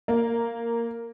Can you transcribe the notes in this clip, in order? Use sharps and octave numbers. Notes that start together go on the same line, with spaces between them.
A#3